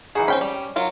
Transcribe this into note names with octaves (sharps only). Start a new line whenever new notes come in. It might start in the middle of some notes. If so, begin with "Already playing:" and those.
E3 D#4 F#4 G#4
C4 C#4 G5 B5
G3
F#3 F4 A#4